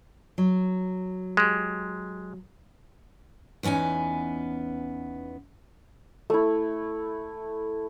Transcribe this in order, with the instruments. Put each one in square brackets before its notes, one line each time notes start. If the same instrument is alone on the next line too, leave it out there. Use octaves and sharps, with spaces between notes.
[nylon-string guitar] F#3
[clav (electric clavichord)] G#3 G4
[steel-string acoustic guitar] E2 B3 C#4 D#4 G#5
[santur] A3 E4